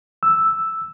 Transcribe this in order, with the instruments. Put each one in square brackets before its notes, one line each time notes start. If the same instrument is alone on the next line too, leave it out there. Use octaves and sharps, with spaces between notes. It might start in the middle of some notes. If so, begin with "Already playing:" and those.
[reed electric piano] E6